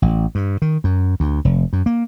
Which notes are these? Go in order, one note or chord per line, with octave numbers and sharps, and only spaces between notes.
A1
G2
D#3
F#2
D2
F1
F#2
A#3